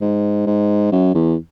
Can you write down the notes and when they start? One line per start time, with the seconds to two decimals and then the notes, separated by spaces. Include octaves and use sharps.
0.01 G#2
0.47 G#2
0.92 F#2
1.14 E2